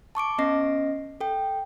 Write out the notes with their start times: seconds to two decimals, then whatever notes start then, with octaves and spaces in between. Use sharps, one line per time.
0.15 A5 C#6 D6 D7
0.38 B3 C#4 D#5 A#6 C7
1.20 A4 G5